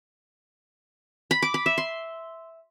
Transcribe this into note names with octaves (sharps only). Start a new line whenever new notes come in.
B5
D6
B5
E5
C6